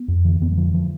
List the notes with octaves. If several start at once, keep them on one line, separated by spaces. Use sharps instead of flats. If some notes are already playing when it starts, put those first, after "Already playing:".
Already playing: B3
F2
D3 E3
F2 B3
G#3
D3 F3
D3 F3